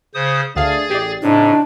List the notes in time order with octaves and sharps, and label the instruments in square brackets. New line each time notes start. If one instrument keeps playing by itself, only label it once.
[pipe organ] C#3 C5 D#6
[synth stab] D2 F5 [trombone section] A3 D4 [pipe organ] G#4 A6
[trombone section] A1 [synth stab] G4 D5
[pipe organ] A2 [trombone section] C#3 C4 D#4 [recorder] D4